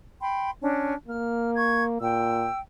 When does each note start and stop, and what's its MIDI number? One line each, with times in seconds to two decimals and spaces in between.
0.21 0.50 79
0.21 0.50 83
0.21 0.50 84
0.60 0.94 61
0.60 0.94 62
1.08 1.99 58
1.08 1.49 89
1.56 1.83 85
1.56 1.83 92
2.01 2.47 46
2.01 2.57 79
2.01 2.57 88